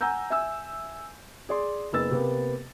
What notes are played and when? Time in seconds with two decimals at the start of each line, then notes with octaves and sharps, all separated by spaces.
0.01 F#5 G#5 A#5 E6 G6
0.30 E5 G#5 E6
1.49 G#4 D5 C6
1.92 F#1 B3 E6 A6
2.11 C3 A#3 B3